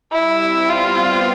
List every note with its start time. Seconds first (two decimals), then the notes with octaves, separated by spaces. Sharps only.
0.12 G3 E4
0.40 C4
0.69 B3 F4
0.97 C4